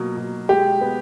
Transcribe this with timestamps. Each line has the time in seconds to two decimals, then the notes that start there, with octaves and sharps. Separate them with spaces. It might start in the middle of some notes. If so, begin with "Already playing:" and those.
Already playing: B2 F#3 A#3
0.17 B2
0.49 G#3 G4
0.81 B3